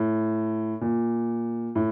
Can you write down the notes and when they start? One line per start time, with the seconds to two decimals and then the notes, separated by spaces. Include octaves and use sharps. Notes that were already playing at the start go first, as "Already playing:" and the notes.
Already playing: A2
0.81 A#2
1.75 A2